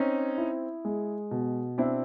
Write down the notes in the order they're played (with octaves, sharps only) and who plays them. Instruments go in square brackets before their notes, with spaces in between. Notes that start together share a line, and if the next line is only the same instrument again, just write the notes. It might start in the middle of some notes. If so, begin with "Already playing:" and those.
Already playing: [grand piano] C4 [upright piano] C#4 D#4
[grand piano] E4
G#3
B2
[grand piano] C4 [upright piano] D4 E4